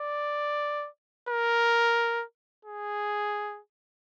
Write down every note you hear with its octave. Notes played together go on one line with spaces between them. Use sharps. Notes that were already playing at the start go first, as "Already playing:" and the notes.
Already playing: D5
A#4
G#4